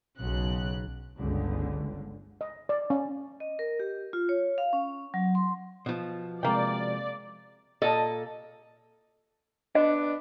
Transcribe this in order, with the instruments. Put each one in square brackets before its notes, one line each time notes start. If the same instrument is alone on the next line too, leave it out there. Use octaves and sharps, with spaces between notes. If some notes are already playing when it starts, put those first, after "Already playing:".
[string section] B1 C#3 F#6
[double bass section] G1 C#2 D3
[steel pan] D#5
D5
C#4
[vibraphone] D#5
A#4
G4
F4
C#5
F5
C#4
F#3
C6
[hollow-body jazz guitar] B2 F3
[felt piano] C3 G#3 [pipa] A#3 G5 [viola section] D5
[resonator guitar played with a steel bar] A#2 A4 D#5
[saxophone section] B3 D4 [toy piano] D#5